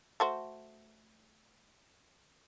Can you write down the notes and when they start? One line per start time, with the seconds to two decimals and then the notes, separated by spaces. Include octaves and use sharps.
0.20 A3 F#4 C5